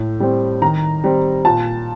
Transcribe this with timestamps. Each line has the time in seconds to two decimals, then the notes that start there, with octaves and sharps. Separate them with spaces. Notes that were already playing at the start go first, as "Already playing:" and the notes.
Already playing: A2
0.20 G3 C4
0.62 D#3 A#5
1.04 G3 C4
1.45 A#2 A5